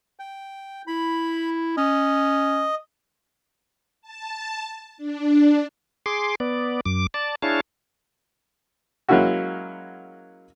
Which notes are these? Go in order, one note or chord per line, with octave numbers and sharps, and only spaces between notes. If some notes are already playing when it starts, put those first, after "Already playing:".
G5
E4 B5
C#4 D#5
A5
D4
G#4 C6 D6
B3 D5
F#2 D6
D5 A5
D4 E4 G#4 C#5 F5 A5
F#3 G#3 A#3 C#4 E4 F#4